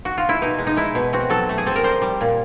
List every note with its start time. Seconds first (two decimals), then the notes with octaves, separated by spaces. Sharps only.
0.05 F#4
0.18 F4
0.29 E4
0.41 B2 D#4
0.58 G#3
0.67 D#4
0.76 G#3 E4
0.95 B2
1.13 C4 F#4
1.30 F#3 A4
1.49 A3
1.58 G#4
1.66 C4 A4
1.76 A#4
1.84 G3 C5
2.02 G3
2.21 A#2